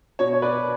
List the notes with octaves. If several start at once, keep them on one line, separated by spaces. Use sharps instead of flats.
B2 C#5
C#5
B4 D5